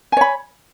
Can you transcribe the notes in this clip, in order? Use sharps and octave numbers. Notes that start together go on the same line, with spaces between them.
C#5 G#5 B5